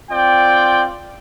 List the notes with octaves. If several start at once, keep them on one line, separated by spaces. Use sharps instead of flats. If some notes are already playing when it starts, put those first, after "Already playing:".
C4 F4 D5 G5